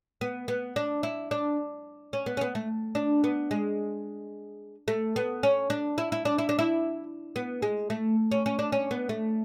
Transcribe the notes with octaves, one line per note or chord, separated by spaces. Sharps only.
B3
B3
D4
E4
D4
C#4
B3
C#4
B3
A3
D4
B3
G#3
A3
B3
C#4
D4
E4
E4
D4
E4
D4
E4
B3
G#3
A3
C#4
C#4
D4
C#4
B3
A3